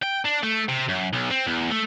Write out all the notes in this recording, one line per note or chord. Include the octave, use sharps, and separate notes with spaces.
G5
D4
A3
C3
F#2
B1
C4
E2
A3